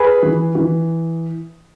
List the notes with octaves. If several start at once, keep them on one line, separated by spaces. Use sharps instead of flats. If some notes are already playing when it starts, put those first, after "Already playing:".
Already playing: G#4 B4
E3
E3